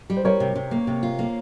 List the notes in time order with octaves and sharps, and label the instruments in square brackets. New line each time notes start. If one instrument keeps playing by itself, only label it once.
[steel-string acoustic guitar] G3
[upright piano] C5
[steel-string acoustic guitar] G3 [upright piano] A#4 C#5
[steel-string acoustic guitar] C3
C3
A#3
C3
F4
A#3